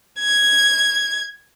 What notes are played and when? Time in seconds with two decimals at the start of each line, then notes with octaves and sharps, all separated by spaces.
0.20 G#6